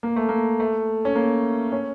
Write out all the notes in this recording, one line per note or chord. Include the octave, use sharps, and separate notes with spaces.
A#3
A3
A#3
A3
C#4
A#3
C#4